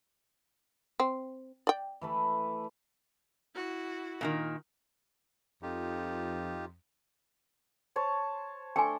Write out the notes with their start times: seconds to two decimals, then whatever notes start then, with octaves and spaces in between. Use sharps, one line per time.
1.00 C4
1.67 D5 G5
2.01 E3 A3 B4
3.55 E4 F#4
4.21 A#2 D3 D#3
5.63 F2 D#4 F4 G4
7.96 C5 C#5 A5
8.76 A3 D4 G5 G#5 C6